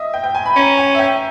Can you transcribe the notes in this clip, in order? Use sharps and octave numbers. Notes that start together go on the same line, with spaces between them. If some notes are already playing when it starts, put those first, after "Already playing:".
Already playing: D#5 E5
G5
G5
G#5
B5
C#4 A#5
G#5
E5
G5